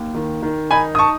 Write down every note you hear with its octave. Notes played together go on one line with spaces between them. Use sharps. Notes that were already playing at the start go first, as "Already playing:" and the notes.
Already playing: D#2
D#3
D#3
D#4 G#5 B5
D#6
A5 C#6